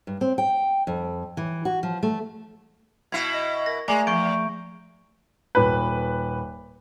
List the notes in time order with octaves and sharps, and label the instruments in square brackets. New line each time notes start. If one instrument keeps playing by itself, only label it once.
[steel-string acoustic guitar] G2
C4
G5
F2
E3
F#4
F3
A3
[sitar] B2 E4 [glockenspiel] G#6
[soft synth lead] D#5
[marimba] A#4 [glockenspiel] A#6
[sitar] G#3 [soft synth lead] A3 [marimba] D5 G#5 D6 [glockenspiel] A#5
[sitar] E2 [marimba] F3 [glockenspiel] C#6 G6 D7
[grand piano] D#1 B4